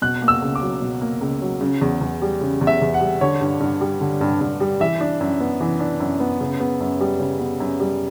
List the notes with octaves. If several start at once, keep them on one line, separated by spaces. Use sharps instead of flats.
B2 F#6
A#3
E6
C#2
D6
F#3
B2
A#3
C#2
F#3
C#3
E2
E2
G3
C#3
E2
E5
E2
F#5
G3
D3 C#5
G2
G2
G3
D3
G2
G2
G3
E3 E5
D4
F#2
B3
E3
D4
F#2
B3
C#3
B3
F#2
G3
C#3
B3
F#2
G3